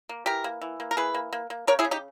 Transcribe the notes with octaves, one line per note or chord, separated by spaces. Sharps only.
A#3
E3 G4 A#4
A#3
E3
A#3
A#4
E3 G#4 B4
A#3
A#3
A#3
C#3 A#4 C#5
E4 G#4
C#3
D#4 G4